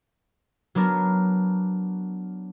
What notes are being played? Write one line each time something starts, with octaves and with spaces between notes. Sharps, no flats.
F#3 B3 D4 A#4